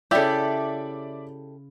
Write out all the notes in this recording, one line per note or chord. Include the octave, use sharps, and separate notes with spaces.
C#3 E4 G4 A4 D5 E5